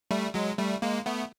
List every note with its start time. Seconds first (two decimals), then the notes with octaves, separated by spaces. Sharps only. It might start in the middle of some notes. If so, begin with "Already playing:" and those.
0.11 G3 A3
0.34 F#3 G#3
0.58 G3 A3
0.82 G#3 A#3
1.06 A3 B3